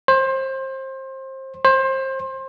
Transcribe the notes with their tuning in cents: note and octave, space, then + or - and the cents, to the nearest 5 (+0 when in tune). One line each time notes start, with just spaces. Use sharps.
C5 +25
C5 +25